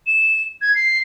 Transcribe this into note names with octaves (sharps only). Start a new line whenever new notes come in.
E7
G#6
C7